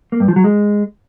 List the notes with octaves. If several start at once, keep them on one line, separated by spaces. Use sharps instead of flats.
A#3
G2
F3
F#3
G#3